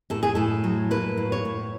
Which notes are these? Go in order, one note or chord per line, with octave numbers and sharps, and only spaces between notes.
A2 A4
G#4
A2 A4
F#3
A#3 B4
A2
C#5
A2